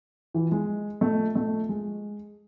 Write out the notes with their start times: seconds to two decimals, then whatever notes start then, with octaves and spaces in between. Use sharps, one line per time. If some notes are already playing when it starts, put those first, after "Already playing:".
0.34 E3
0.52 G#3
1.01 A3
1.35 A3
1.69 G#3